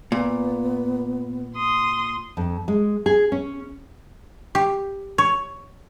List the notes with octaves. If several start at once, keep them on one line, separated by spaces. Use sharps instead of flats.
A#2 B3
C6 D#6
F2
G#3
G#4
C#4
G4
C#5